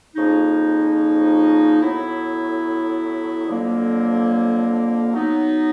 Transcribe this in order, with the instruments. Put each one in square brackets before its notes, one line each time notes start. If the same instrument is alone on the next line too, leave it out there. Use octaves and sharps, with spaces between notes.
[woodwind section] F2 C#3 F3 A#3 D#4
A2 F#3 B3 E4
F2 D3 F#3 A#3
F#3 B3 D#4